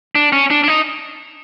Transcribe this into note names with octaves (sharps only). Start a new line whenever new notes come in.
D4
C#4
D4
D4
D#4